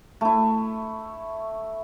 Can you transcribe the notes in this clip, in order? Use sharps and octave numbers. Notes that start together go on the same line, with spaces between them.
A3 E4